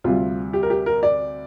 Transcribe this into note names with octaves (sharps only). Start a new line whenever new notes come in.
D2 C3 G3 F4
G4
A#4
G4
A#4
D5